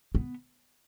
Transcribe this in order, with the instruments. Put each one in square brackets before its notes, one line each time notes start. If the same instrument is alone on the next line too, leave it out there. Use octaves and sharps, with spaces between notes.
[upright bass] B3